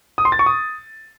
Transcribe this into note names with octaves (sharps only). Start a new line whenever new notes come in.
D#6
C6
A6
C#6
D#6